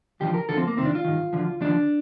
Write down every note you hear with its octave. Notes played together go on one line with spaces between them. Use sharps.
D#2 D3 F3 G4
A#4
D2 D3 F3 A4
C4
A#3
F2 C3 D#3 C4
D4
F4
G2 D#3
D2 D3 F3
D#2 D3 F3 D4